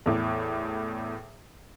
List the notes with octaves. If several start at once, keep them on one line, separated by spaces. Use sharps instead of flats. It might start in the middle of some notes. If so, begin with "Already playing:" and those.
E2 A2